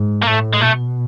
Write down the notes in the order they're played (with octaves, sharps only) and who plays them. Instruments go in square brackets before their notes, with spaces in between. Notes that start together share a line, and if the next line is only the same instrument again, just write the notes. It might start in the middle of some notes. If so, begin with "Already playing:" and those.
Already playing: [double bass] G#2
[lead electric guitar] A#3
[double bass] A2 [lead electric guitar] A3
[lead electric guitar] G#3
[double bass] B2 [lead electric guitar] A3